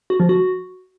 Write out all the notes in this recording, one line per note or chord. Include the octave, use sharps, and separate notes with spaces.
F#4
F3
F#4